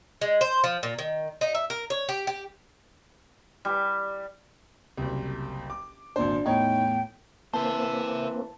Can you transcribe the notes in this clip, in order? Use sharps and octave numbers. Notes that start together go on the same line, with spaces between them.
G#3
C5
F3
A#2
D#3
D#4
E5
A#4
C#5
G4
G4
G3
F#1 C2
D6
G#1 A#2 D4 C5
E2 A2 D#4 C#5 G5
E3 A#3 C4 C5 E5 A5